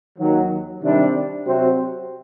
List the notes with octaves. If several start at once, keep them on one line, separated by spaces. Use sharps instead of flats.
D#2 D#3 F#3
C3 D#3 G3 D4
C3 F#3 C4 F#4 C5